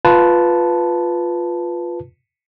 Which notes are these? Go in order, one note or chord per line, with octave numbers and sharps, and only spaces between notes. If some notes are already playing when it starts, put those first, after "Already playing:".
F4 B4 A5